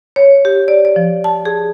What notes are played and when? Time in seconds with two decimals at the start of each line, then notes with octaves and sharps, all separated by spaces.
0.16 C#5
0.45 G4
0.68 D5
0.85 D5
0.96 F3
1.24 A5
1.45 G#4